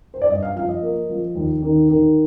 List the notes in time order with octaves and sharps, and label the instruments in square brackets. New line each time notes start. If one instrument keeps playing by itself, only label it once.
[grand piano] C5
D5
G2 D#5
F5
F3 F5
D#5
A#3
F3
D#2
D#3
D#3